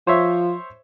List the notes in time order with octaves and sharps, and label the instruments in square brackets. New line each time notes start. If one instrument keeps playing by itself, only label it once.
[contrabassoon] F3 [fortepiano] C5 C#5 E5